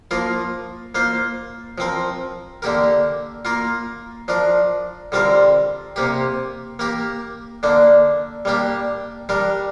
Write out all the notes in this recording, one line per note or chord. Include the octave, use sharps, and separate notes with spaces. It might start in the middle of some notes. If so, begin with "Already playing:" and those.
F3 A#3 F4 A#4
A#3 F4 C5
F3 C4 A#4
D3 A#3 G4 A#4
A#3 F4 A#4
F3 D4 A#4
D3 G3 C4 F4 A#4
C3 A#3 G4
A#3 G4 A#4
D3 A#3 D4
G3 A#3 D4 G4
G3 D4 A#4